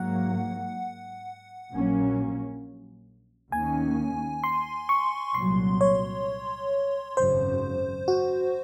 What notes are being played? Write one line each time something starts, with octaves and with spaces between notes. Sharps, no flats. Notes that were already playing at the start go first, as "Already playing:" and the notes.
Already playing: G#2 F#3 A#3 F#5
A#1 A#2 F#3 A#3 C#4
D#2 D#3 A#3 C#4 G#5
C6
C#6
C2 A#2 F#3 C6
C#5
G#1 F#2 C#3 C5
F#4